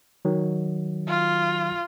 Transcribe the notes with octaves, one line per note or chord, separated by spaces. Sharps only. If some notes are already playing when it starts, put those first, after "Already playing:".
D#3 F#3
F4